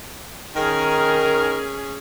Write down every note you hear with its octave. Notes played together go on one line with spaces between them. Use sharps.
D#3 C#4 G#4 A#4